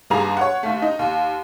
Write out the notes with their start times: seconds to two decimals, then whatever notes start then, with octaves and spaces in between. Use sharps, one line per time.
0.10 G1 D#2 G#4 A#5
0.37 C#5 F#5
0.63 D#2 A3
0.82 D#4
0.99 D#2